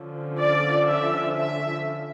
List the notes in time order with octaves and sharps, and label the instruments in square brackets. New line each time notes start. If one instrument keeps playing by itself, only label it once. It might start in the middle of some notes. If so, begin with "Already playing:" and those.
Already playing: [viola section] D3 F3 C#4
D5
E5
E5